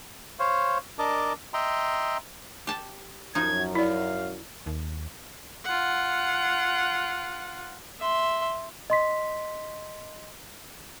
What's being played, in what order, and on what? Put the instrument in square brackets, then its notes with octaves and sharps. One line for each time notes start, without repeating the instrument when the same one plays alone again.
[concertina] C5 C#5 F5
D4 A#4 D#5 A5 D6
D#5 E5 G5 A#5 C6
[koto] G4 A5
[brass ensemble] F#2 [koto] F3 D#4 [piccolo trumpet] G#6
[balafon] E4 D5 [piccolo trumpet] F5
[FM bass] D#2
[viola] F4 F#5
[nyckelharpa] E5 C6
[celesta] D#5 C6 B6